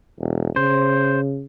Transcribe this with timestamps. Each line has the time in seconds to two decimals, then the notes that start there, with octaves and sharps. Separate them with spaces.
0.19 E1
0.56 C#3 C5